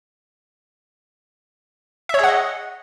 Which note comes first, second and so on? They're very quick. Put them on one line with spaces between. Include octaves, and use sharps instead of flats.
E5 C#5 G#4 F#5 D#5